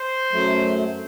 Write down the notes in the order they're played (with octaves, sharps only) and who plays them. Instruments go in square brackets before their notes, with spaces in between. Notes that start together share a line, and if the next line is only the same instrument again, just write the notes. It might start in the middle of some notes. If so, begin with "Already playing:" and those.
Already playing: [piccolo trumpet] C5
[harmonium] F#2 F#3 A3